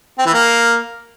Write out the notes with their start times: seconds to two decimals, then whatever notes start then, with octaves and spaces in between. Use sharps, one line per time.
0.18 C4
0.26 E3
0.34 A#3